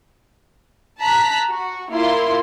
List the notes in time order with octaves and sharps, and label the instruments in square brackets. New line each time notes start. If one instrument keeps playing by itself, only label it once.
[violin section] A5 A#5 F#6 B6
F#4
A#3 E4 F4 C6